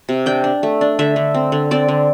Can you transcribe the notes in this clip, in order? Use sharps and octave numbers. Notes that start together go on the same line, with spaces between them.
C3
D4 G5
D4
A3
D4
D3 E5
D3
C4
D3
C4 D5
D3